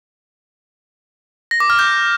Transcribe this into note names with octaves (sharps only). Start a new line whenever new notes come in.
A#6
D6
F6
G6